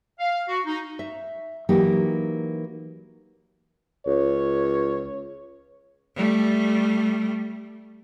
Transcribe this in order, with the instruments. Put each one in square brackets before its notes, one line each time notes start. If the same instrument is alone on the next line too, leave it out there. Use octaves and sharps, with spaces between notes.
[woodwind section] F5
F#4
D#4
[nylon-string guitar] E5
E3 F#3 A#3 D#4 G4
[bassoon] C#2 [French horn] C#5
[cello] G3 A3